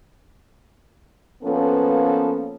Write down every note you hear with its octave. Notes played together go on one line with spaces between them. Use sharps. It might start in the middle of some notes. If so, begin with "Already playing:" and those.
F3 A#3 B3 C#4 A4 B4